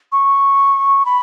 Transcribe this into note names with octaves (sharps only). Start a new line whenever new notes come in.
C#6
B5